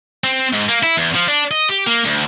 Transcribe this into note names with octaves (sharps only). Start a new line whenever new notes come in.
C4
G#2
A#3
E4
E2
F3
D4
D#5
G4
A#3
D2